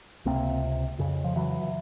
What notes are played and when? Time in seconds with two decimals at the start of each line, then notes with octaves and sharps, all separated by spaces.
0.25 C#2 C3 A#3 C4
0.98 F2 C#3
1.24 F3
1.36 E3 F#3